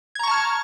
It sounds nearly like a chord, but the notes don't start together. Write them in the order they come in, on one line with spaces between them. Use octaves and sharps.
G#6 A#5 C#6 A5 F6